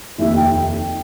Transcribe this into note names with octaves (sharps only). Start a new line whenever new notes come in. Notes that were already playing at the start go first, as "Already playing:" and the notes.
F1 D#2 D#3 E5
G5